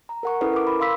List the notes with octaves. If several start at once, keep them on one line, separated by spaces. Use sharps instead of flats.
A#5
A#4 F#5 C#6
C#4 E4 A4 B4
A#4 D6
B5
F5 C6 E6 B6